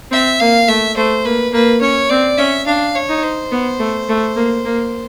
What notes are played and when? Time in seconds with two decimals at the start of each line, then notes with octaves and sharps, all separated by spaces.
0.11 C4 E5
0.40 A#3 F5
0.68 A3 E5
0.97 A3 C5
1.25 A#3 B4
1.53 A#3 B4
1.81 C#4 C#5
2.09 C4 D5
2.38 C#4 E5
2.66 D4 F5
2.95 C#5
3.09 D#4
3.23 C5
3.52 B3
3.79 A3
4.09 A3
4.36 A#3
4.65 A#3